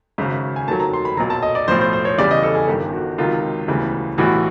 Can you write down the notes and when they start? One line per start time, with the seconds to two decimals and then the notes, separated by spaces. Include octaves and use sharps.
0.18 G#1 F#2 C#3
0.56 G#5
0.68 F1 D#2 D#3 F#3 A5
0.80 A#5
0.93 C6
1.05 B5
1.17 B1 A#2 F#3 A#5
1.30 A5
1.43 D#5
1.55 D5
1.68 B1 A2 F3 C5
1.81 C5
1.93 C5
2.05 C#5
2.18 E2 C#3 E3 G3 D5
2.31 D#5
2.43 A4
2.55 G#4
2.68 G1 G2 D#3 G4
2.93 F#4
3.18 C#2 C3 D#3 F#3 F4
3.68 E1 D2 C#3 E3 G3
4.17 B1 A2 E3 G3 F#4